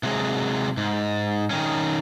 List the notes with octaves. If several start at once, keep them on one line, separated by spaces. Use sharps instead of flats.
C3 F#3 G#3
G#2
D#3 C#4